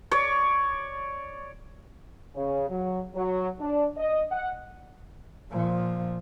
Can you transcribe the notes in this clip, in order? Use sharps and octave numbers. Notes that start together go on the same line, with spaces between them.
C#5 D5
C#3
F#3
F#3
D4
D#5
F#5
A#2 F3